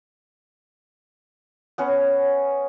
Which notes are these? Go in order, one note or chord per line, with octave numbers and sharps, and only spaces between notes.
B3 C#4 C#5